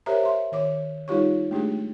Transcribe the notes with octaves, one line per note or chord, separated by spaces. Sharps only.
G4 A#4 C5 C#5 E5 A#5
E5 C6
D#3 C#5 D6
G3 D#4 F4 G4 C#5 C#6
G#3 A3 D4 G4 G#4